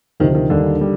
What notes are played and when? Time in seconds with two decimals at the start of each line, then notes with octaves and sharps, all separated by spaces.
0.20 D2 C3 D#3 F3
0.34 D#3
0.50 D#2 D3 D#3 G3 D4
0.81 G3